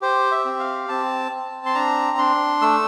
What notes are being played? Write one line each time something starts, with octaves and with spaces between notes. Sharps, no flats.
G4 C5
E5
C4
F5
C4 A5
C4
C6
D4 A#5
D4 C6
A3 E6